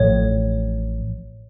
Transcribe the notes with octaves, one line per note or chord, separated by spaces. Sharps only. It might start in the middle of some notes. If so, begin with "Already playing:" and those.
Already playing: A1 A2 F3 C#5